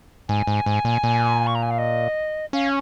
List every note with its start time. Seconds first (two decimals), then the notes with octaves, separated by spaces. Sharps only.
0.28 G#2 G#5
0.47 G#2
0.66 G#2
0.85 A#2
1.03 A#2
1.47 C#6
1.55 A#5
1.62 G#5
1.70 F5
1.78 D#5
2.53 C#4 F5